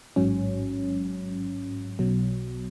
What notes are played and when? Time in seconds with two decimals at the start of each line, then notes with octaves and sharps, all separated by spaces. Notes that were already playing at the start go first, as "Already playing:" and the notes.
0.16 A1 G#2 F#3 C#4
1.99 B1 B2 F#3